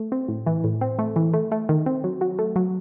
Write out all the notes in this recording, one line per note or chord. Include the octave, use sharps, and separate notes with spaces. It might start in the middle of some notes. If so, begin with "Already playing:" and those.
Already playing: A3
C4
A2
E3
A2
C4
A3
E3
A3
A3
D#3
C4
F#3
F#3
A3
F#3